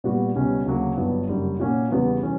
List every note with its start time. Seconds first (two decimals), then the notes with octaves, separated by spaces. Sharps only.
0.04 A#2 G3 B3 F#4
0.35 C#2 B2 G3 C#4
0.66 D2 C#3 F#3 A#3
0.97 G1 G2 F#3 B3
1.29 F#1 F#2 D3 G3
1.60 A#2 A#3 C#4 F#4
1.91 E2 C#3 G3 B3 F#4
2.23 E3 G3 C#4